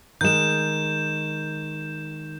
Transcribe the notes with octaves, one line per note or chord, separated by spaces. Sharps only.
D#3 G#3 G6 E7